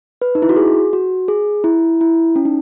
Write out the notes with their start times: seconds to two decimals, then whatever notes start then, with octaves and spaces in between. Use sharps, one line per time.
0.22 B4
0.35 D#4
0.42 E4
0.49 F#4
0.56 G#4
0.93 F#4
1.28 G#4
1.64 E4
2.01 E4
2.36 C#4
2.45 D#4